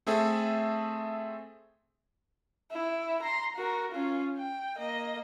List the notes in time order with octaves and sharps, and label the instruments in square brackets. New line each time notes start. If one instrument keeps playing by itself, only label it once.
[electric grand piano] A3 C4 G#4 A4 E5
[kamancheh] E4
A#5 C6
F#4 A#4
C#4 F4
G5
A#3 D#5